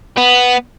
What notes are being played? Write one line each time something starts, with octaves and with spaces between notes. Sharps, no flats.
B3